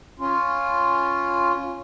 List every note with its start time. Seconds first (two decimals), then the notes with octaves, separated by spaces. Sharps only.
0.19 C#4 F4